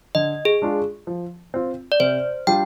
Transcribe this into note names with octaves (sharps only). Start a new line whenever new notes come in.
D3 D#5
G#4
G#3 D4 F4
F3
C4 F4
D5
C3 C5
G3 D4 F4 G5